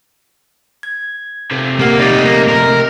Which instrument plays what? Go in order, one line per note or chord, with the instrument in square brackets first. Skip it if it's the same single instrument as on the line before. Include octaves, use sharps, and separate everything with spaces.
[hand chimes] G#6
[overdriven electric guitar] C3 A3
[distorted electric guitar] A#3 [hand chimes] G4 F#5
[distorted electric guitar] D#4 D5 [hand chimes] G4 D#5
[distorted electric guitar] A#3 A#4
A#4